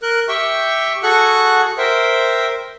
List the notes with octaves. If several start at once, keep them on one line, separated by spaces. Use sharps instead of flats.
A#4 F#6
G4 E5 G5 C#6
F#4 G#4 A4 F#5 C#6 F#6
A#4 C5 E5 G5